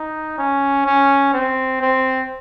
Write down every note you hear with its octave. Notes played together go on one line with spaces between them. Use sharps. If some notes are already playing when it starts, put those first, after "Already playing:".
Already playing: D#4
C#4
C#4
C4
C4